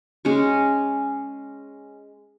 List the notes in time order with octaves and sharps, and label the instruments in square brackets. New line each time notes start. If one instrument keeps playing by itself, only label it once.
[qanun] G#3 C#4 C#6